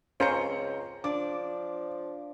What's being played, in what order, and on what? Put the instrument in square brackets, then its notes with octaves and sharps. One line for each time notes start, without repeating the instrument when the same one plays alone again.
[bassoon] C#2 [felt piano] C4 A#5 C#7 [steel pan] C#4 F4 C5
[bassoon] F3 [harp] D4 D5 [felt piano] D6